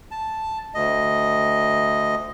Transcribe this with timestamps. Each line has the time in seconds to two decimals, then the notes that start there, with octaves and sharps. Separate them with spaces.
0.11 A5
0.74 D2 D#5